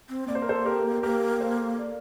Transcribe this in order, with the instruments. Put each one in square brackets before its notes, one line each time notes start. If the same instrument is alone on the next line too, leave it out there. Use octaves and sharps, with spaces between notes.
[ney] C4
[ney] A#3 [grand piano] D5
[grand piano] C5
A#4
A4 C5
G4 A#4
[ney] A#3 [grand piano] G4 A#4
[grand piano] A4 C5
A#4 D5